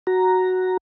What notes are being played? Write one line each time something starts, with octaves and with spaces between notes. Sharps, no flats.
F#4 A#5